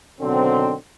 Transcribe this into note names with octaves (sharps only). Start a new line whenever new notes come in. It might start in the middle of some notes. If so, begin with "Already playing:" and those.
B2 D3 D#3 F#3 C4